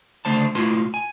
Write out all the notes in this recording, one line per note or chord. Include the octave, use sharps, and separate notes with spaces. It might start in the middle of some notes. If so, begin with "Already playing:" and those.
C#2 D3 A3 C5 A5
B1 A3 E4 F4 B4 C6
G#5